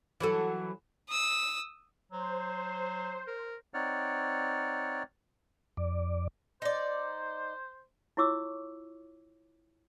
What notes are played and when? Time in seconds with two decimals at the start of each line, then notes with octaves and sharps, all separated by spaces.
0.20 E3 F#3 A4
1.09 D#6 E6
2.12 F#3 C5
3.27 A#4
3.74 C4 D#4 C#5 D5 F#5 F6
5.77 F2 D5
6.62 D#4 C5 D5
8.17 E4 F4 C#5 C#6 D6 E6